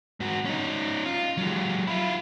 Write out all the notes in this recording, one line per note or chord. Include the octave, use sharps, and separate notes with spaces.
G#2 F#4
C#4 D#4
F4
F#3 G#3
E4 F4